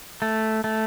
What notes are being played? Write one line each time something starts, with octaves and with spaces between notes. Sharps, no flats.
A3
A3